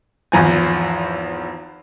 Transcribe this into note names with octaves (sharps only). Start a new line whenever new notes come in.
G#1 E2 F3 G#5